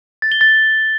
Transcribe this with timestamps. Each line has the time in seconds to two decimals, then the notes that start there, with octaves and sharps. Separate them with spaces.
0.22 A6
0.32 G7
0.41 A6